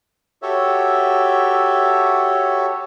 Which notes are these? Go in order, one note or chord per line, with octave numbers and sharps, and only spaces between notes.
F#4 G4 A4 C#5 E5